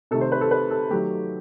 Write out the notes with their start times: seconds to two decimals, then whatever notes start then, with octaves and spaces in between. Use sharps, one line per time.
0.11 C3 D#3 A3 A4
0.21 C5
0.32 B4
0.41 A4
0.51 B4
0.71 A4
0.90 D#3 F#3 A3 G4